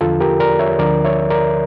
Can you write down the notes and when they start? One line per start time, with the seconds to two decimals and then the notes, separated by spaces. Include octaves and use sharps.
0.01 E2 D3 F3 F4 A4
0.20 G4 A#4
0.40 A#4 D5
0.59 C#5 E5
0.79 D2 D3 F3 A#4 D5
1.04 C#5 E5
1.31 A#4 D5